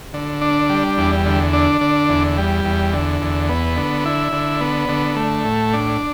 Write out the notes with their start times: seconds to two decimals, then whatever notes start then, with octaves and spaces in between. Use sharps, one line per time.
0.14 D3
0.41 D4
0.70 G3
0.98 E2
1.26 D3
1.53 D4
1.81 D3
2.09 E2
2.38 G3
2.65 E2
2.93 D3
3.22 E2
3.49 B3
3.77 D3
4.06 E4
4.33 D3
4.61 B3
4.89 D3
5.16 A3
5.45 A2
5.73 D4